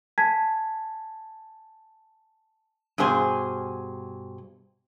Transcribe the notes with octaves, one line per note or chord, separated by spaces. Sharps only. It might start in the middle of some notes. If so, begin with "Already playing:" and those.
G#5 A5 G#6 B6
G2 B2 G#4 C5 G#5